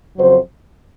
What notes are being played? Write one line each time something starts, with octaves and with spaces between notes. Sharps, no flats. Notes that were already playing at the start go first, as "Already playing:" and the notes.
F2 C#3 F#3 C5